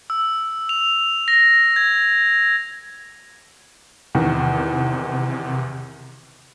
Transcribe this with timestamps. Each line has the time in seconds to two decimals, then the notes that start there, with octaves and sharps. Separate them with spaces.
0.10 E6
0.69 F7
1.28 A#6
1.76 G#6
4.15 E2 C3 D#3